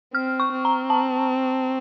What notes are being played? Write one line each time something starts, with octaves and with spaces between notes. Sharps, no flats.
C4 F6
C#6
C4
A#5
A5